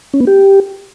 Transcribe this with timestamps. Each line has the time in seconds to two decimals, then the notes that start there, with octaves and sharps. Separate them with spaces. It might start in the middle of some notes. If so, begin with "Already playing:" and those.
0.14 C#4
0.20 B3
0.27 G4